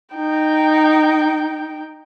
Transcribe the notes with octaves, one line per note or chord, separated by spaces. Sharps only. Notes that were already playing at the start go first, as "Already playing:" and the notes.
D#4 G5